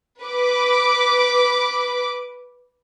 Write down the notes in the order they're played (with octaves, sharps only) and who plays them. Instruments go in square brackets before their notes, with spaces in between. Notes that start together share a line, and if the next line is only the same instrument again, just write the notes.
[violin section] B4 D6